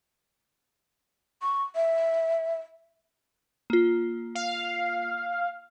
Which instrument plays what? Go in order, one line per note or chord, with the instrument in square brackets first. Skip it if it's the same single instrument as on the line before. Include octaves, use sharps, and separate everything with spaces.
[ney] C#6
E5
[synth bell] A#3 F4
[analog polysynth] F5